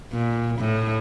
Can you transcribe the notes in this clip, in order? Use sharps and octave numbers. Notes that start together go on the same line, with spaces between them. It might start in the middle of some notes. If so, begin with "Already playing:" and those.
A#2
A2